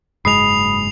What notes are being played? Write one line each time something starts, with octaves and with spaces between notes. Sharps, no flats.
F#1 G#2 G#3 B5 D#6 C7 F7